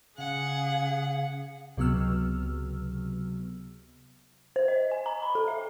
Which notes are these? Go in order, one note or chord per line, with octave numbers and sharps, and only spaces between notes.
C#3 G#4 F5 F#5
C#2 C3 F#3 B3 E6 F6
C5
D#5
G#5
A#5
B5
A4
E5